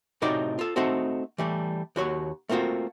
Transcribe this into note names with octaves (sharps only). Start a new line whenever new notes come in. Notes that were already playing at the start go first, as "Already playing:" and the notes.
A2 C3 D#4 F#4 D5 G5
F4 A4
A3 C4 D#4 F#4 A4
E3 G3 A3
D#2 F#4 C#5
A3 A#3 C4 F4 F#4